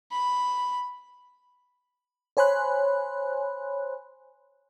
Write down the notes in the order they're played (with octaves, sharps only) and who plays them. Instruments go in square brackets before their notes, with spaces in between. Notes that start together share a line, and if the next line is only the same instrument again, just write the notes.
[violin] B5
[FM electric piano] C5 C#5 G#5 B5 C6 F#6